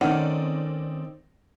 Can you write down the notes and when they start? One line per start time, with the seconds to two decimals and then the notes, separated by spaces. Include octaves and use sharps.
0.01 D#3 A3 C4 C#4 D#4 D5 F#5